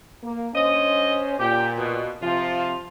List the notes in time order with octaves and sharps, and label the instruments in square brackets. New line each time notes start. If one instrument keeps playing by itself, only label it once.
[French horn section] A#3
[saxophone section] G2 D#5 [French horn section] C#4 C5
[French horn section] A#2 [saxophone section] G4
[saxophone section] B2
[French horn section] C3 F3 [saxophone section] F4